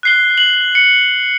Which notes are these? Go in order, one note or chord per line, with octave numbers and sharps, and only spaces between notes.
F#6 C7 G7
F#7
C#7